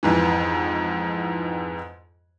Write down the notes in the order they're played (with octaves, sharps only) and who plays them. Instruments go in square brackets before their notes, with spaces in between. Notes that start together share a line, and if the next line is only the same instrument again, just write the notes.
[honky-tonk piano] F2 G#2 E3